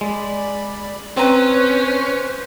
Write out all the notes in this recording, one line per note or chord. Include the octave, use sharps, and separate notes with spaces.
G#3 D5 B5
C4 C#4 B4 A#5
C5